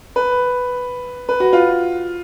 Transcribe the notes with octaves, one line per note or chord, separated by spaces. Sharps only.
B4
B4
F#4
F4